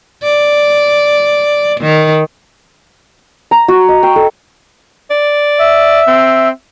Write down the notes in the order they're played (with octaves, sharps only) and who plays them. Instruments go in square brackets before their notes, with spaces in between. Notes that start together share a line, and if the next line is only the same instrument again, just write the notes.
[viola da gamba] D5
D#3
[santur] A#5
F#4
D#5
G5
A4
[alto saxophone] D5
[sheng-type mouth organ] E5
[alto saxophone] C4